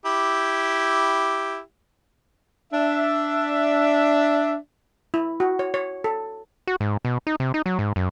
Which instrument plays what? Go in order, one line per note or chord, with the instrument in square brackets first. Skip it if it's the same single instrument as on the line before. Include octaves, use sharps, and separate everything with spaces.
[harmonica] E4 G4
[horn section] D4 E5
[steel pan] E4
F#4
C#5
C#5
A4
[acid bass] F#4
G#2
B2
D#4
C3
D#4
F#3
G#2
F#2